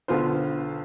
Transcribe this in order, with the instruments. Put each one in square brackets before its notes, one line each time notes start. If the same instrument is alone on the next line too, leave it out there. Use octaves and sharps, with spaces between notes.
[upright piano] B1 D3 B3 F4 C5